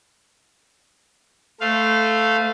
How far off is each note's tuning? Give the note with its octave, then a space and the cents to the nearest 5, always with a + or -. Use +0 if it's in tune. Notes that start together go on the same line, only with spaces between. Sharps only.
A3 +0 C5 -30 F5 +0